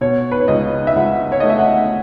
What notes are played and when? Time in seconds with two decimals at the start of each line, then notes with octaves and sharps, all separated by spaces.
0.01 B2 C#5
0.32 B4
0.40 C#5
0.48 C#2 D#5
0.87 E5
0.96 C#2 F#5
1.32 C#5
1.40 A3 D#5
1.50 E5
1.58 F#5